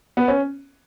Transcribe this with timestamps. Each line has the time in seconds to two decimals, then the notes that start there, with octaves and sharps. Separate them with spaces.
0.17 B3
0.28 C#4